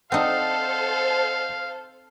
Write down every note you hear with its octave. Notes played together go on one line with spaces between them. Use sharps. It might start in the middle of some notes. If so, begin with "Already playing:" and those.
C4 D#4 A4 C5 D5 D#5 F5 F#5